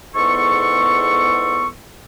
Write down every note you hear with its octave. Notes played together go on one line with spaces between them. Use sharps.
E2 G#2 B3 A4 C6 C#6